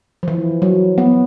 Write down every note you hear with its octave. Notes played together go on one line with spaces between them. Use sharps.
F3
E3
F#3
B3